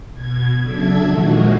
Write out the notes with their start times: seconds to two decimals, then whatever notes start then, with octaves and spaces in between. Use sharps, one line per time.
0.11 B2 G#6
0.61 C#3 F#3 D4 A4 E5 G#6
1.02 A#2 D#3 F3 G#3 A#3 F#4